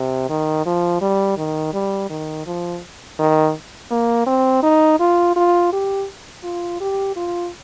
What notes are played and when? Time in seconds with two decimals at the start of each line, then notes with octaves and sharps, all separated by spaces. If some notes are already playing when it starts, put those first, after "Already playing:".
Already playing: C3
0.29 D#3
0.66 F3
1.01 G3
1.37 D#3
1.73 G3
2.10 D#3
2.46 F3
3.19 D#3
3.91 A#3
4.27 C4
4.63 D#4
4.99 F4
5.36 F4
5.73 G4
6.44 F4
6.80 G4
7.16 F4